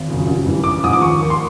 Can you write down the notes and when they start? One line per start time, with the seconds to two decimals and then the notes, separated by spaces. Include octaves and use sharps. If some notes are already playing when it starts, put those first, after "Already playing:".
Already playing: G#1
0.08 F#2 C#3 F3
0.27 A1
0.46 G2 E3
0.64 A1 D6
0.83 G#2 F3 D#6
0.93 D6
1.01 D#2 C#6
1.20 D#3
1.30 C6